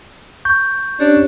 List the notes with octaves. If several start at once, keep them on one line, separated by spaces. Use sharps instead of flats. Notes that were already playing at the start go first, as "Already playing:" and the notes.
C#6 G6
C#4 D4 G4 C#5